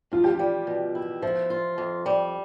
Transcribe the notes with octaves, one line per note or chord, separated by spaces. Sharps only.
D2 F4
G4
G3 F4
B2
E4
F3 E5
F4
F2
G3